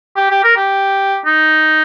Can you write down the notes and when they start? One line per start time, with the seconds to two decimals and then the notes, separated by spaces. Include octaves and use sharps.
0.17 G4
0.31 G4
0.44 A#4
0.57 G4
1.26 D#4